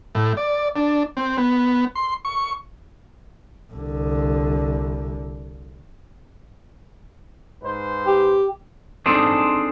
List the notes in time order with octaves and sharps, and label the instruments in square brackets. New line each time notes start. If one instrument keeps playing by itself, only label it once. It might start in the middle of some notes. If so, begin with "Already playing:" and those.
[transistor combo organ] A2
D5
D4
C4
B3
C6
C#6
[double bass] C2 D3
[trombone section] G#2 B4 C5
[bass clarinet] G4
[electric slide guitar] C4 D4 D#4 G#4 A4 C5